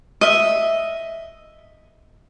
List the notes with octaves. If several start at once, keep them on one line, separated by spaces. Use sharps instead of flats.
D#5 E5